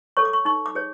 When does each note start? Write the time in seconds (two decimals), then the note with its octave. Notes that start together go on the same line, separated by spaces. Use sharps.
0.17 A4 C#5 C#6
0.25 D6
0.33 C#6
0.45 D#4 C#6
0.66 D6
0.75 G#4 C#5